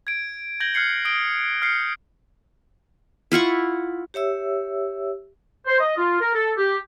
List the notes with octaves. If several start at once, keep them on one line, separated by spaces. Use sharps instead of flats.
G#6 D7
G6 G#6 A#6 F#7 G7
F6 F#6 G#6 C7 C#7 F#7
D#6 D7 G7
F6 G6 C7 C#7
E4 F4 F#5 C#6
G4 C#5 E5 E6
C5
D#5
F4
A#4
A4
G4